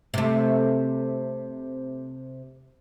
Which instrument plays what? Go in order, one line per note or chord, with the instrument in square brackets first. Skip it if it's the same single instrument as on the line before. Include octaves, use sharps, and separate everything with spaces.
[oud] C3 A3